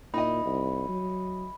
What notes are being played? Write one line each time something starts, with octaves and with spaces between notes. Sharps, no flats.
A#2 D#4 E4 D#5 B5
C2
F#3